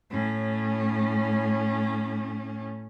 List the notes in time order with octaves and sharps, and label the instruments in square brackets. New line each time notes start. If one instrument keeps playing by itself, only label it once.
[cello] A2 C#4